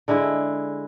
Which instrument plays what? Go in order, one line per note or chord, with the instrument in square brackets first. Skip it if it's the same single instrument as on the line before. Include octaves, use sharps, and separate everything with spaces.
[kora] D3 G#3 E4